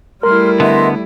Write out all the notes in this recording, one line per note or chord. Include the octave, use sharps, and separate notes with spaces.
G3 A3 E4 A#4 C6 F6
D3 B3 D#5 E5 C6